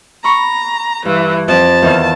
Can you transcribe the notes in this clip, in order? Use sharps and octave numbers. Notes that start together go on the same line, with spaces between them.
A#5 B5 C#6
G2 E3
F2 A5
E2 D#3 F5